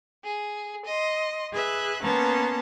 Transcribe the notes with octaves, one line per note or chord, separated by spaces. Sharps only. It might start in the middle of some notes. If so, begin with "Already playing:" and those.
G#4
D#5 C6
G#4 B4 E5 F#6
A#3 B3 C#4 A5 A#5 C6